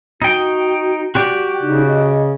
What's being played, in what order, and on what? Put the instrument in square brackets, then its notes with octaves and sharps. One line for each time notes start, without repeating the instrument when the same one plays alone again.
[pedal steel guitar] D#4 G5 [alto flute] F#4
[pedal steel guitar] F#4 G4 D5 [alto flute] G5
[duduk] C#3 [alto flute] D#4
[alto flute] D#5